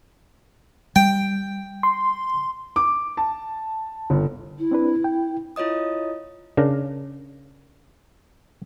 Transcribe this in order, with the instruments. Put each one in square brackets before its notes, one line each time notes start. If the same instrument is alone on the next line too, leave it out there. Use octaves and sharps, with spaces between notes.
[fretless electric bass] G3 [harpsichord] G5
[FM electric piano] C6
[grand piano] D6
A5
G1
[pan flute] E4
[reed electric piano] C4 D4 B4
G5
[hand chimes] E4 F4 C#5 D#5 D#6
[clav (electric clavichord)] C#3 D4 A#4 A#5